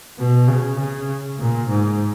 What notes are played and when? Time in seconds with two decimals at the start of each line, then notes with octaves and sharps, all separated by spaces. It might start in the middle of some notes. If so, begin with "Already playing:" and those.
0.18 B2
0.48 C#3
0.79 C#3
1.38 A#2
1.68 G#2